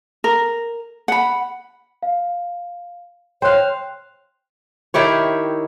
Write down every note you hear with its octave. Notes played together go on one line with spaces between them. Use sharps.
A#4
F#5 B5
F5
C5 C#5 F5 G5 F#6
D#3 E4 G4 C#5